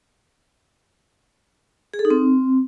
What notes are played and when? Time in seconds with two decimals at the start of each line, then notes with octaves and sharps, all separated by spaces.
1.94 G#4
1.99 A4
2.05 D#4
2.10 C4